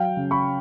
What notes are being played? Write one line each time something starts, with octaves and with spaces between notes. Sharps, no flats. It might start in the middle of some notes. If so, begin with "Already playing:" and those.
Already playing: F#3 F5 G5
C#3
B5 C#6